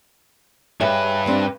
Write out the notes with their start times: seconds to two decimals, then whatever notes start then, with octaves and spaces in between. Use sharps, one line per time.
0.80 G2 G#4 B4 C#5 E5
1.26 G3 C4 D4